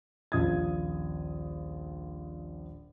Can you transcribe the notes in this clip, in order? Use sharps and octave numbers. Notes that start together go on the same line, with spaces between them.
D#1 A#1 F4 D#5 D#6 G#6